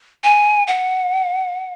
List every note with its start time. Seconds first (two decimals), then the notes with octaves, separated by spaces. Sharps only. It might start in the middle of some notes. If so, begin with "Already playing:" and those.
0.24 G#5
0.67 F#5